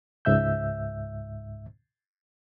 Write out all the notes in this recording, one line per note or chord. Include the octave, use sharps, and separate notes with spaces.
C#2 G#2 E5 E6 G6